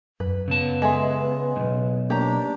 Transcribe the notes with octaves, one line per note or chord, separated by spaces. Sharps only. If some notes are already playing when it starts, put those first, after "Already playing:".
F#2 B4
C#3 B3 A5
G#3 A4 D#5 E5 G#5 C6
B1 G#2
A#3 D4 G4 C#5 A#5